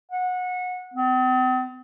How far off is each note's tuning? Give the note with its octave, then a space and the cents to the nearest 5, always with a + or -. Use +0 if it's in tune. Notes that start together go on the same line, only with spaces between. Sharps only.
F#5 -25
C4 -45